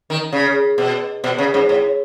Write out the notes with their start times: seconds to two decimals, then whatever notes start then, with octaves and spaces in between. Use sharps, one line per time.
0.10 D#3
0.32 C#3
0.78 B2
1.24 B2
1.38 C#3
1.54 G#2
1.69 A2